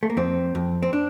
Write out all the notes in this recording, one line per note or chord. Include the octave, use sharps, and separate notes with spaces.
A3
A#3
F2 C4
F2
C4
D4